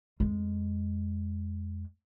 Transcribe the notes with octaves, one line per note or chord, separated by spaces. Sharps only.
F2 G#3